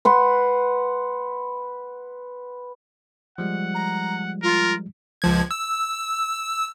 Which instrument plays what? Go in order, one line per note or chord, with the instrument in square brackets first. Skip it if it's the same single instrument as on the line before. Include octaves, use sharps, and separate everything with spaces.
[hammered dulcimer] B4 F#5 C6
[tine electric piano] F3 G3 G#3 [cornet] F#5
[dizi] A#5
[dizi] F4 [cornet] A#4
[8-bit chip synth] C#2 F3 G#6
E6